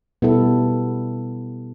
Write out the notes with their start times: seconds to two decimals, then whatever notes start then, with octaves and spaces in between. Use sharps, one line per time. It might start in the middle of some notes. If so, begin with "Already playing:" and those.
0.22 B2 G3 B3 E4 A4